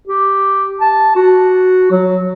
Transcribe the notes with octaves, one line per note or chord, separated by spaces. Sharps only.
G4
A5
F#4
F#3